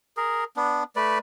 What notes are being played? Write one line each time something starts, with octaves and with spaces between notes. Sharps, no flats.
G#4 A#4
B3 D4
A3 B4 D5